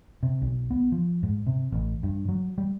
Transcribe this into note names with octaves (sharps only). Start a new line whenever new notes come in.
C3
B1
B3
F3
G#2
C3
A1
G2
F#3
G3